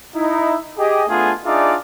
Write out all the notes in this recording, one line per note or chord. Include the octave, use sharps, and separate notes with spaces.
D#4 E4
G4 G#4 D#5
A3 B3 D4 F4 G#4
D4 D#4 F4 G#4 D5 E5